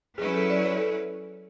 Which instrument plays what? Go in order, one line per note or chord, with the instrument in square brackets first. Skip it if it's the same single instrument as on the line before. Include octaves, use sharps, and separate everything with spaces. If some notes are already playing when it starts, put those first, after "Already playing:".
[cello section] F#3 C#4 E4 B4 [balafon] G#4
[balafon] A4
D5
C#5
A4